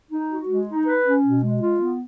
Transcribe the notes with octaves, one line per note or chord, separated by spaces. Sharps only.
D#4
F#4
G#3
D#4
B4
C#4
B2
G#3
F4
B3